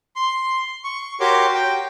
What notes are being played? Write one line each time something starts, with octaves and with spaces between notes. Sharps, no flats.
C6
C#6
F#4 G4 A#4 C#5 C6 D6
G5